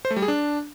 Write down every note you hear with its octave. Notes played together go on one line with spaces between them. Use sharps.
C5
A3
G3
G#4
D4